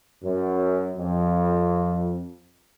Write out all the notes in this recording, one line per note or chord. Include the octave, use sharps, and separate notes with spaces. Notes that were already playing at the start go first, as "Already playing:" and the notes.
F#2
F2